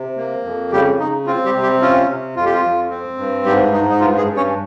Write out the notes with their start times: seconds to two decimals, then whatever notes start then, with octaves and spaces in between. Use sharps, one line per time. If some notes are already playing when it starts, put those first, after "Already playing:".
Already playing: C3
0.17 A#3
0.45 F2
0.72 C#3 G3 G4
0.99 C#3 D#4
1.26 C4 F4
1.45 G3 G4
1.55 C3
1.63 G3 G4
1.81 C#4 F4
2.09 C3
2.36 F2 F4
2.45 G4
2.53 F4
2.63 F2
2.90 C4
3.18 G2
3.45 G#2 G3 G4
3.72 G#2 D#4
3.89 D#4
4.00 G2 F4
4.17 G#3 G#4
4.28 G2
4.37 C#4 C#5